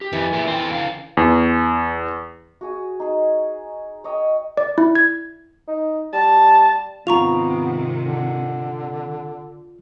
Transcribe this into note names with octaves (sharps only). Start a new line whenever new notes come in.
G4
F2 E3
A#2 G#4 E5
E2 C4 A4 G5
C#2 D3 F5
E2
F#4 G#4 D#6
D#4 G#4
C#5 D#5 G5
D5
E4
G#6
D#4
G3 A5
G#2 C3 D#3 B3 F4 A#5 C#6 F7
D3